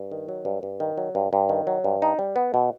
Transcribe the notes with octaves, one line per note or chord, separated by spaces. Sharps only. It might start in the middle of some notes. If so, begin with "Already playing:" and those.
Already playing: G2
D#3
F#3
G2
G2
D#3
F#3
G2
G2
D#3
F#3
G2
D#4
G3
B3
B2